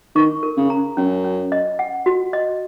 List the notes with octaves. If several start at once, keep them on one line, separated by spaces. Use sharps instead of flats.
D#3 C#6
A#4
C#3
A#5
F#2 C#4
C#4
D#5
F#5
F#4
D#5